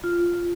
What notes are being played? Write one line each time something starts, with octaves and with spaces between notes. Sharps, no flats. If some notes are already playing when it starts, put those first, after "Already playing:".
F4